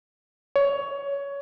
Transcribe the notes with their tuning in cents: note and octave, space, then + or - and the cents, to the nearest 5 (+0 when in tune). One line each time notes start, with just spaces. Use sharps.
C#5 +15